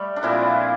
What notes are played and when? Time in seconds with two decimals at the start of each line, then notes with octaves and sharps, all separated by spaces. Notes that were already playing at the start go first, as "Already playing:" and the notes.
Already playing: G3 A3
0.16 D4
0.23 A#2 F3 C4 E4